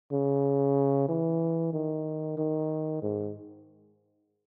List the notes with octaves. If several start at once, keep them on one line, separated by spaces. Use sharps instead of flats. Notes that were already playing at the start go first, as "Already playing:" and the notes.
C#3
E3
D#3
D#3
G#2